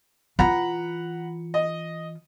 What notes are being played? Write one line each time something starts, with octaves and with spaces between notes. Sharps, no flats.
E3 F4 F#5 A#5 B5
D#5